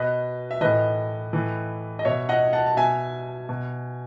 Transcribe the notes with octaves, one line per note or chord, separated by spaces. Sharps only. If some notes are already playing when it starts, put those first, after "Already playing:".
Already playing: B2 B4 D#5
E5
A2 E3 B4 D#5
A2 E3
D#5
B2 C#5 E5
D#5 F#5
F#5 A5
A5
B2 E5 G#5
B2